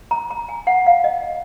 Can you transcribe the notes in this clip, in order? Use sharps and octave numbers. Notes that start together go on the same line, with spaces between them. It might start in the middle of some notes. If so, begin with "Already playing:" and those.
A#5
A#5
G#5
F#5
F5
D#5